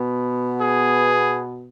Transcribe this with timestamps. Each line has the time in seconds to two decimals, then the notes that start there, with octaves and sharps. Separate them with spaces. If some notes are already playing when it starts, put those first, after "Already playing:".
Already playing: B2 B3
0.59 G#4